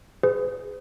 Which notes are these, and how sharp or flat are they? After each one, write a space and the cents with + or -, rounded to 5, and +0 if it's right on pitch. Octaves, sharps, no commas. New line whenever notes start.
G#4 -5 B4 +40